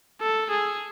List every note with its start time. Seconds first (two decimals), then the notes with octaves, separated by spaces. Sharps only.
0.21 A4
0.51 G#4